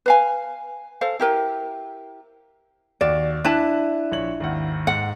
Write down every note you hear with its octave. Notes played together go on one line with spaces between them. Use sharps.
B4 F5 G#5
A4 C5 F5
E4 G4 A#4
D#2 F#4 D5 E7
D4 E4 A5 F#6 D#7 E7
A#1 C#5 F#7
G#1 D#2 F#5
G#2 F#5